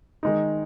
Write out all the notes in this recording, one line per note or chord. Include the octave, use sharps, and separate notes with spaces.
D#3 G#3 D#4